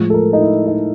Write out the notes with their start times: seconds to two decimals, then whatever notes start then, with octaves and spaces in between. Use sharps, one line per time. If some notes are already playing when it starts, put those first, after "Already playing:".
Already playing: A2 F3 G#3
0.10 A4
0.14 A#4
0.33 D#4
0.41 E4
0.67 D#4